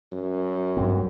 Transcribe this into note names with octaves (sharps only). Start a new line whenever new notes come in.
F#2
G2 F#3 C4